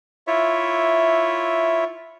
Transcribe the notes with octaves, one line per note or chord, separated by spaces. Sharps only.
E4 F4 C#5 E5